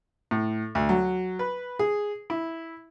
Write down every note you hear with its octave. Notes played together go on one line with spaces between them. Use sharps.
A2
D2
F#3
B4
G#4
E4